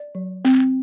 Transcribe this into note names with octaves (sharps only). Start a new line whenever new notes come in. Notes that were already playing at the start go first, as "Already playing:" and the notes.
Already playing: D5
F#3
C4